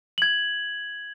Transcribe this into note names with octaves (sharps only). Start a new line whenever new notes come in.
G#6 F#7